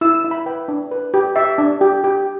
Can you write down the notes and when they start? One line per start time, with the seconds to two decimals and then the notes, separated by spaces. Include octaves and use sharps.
0.01 E4 E6
0.25 E4
0.31 B5
0.46 B4 G5
0.68 D4
0.91 B4
1.14 G4
1.36 G4 E5
1.58 D4
1.81 G4
2.04 G4